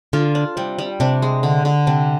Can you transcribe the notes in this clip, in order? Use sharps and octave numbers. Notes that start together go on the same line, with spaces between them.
D3 F4
D4
C3 G3
G3
C3 D4
G#3
D3
D3
C3 D4